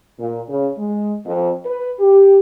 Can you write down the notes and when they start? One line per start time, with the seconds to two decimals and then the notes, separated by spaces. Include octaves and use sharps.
0.20 A#2
0.49 C#3
0.78 G#3
1.26 F2
1.66 B4
2.00 G4